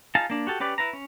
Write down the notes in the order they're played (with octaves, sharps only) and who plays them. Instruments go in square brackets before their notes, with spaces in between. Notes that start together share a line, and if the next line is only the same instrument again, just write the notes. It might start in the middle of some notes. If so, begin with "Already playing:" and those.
[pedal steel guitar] D#4 F4 G#4 A5
A#3 D4
F#4 G4 A4
C#4 G4 B4 D5
E4 B4 A#5
C#4